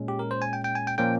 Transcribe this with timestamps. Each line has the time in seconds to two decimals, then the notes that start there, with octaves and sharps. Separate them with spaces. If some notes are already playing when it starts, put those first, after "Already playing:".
Already playing: A#2 G#3 C#4
0.08 G4
0.19 A#4
0.31 C5
0.42 G#5
0.53 G5
0.64 G5
0.75 G#5
0.87 G5
0.98 A#2 F3 A#3 C#4 G5